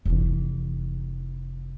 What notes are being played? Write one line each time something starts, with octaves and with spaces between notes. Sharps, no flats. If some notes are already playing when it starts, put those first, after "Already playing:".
F1 E3